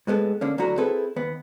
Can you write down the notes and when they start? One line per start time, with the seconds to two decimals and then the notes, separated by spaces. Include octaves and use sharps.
0.07 A2 G#3 B3 A4
0.41 D3 A#3 C#4
0.58 D2 D3 F#3 E4 F#4 A#5
0.78 C4 E4 G#4 A4 B4
1.16 D#2 B3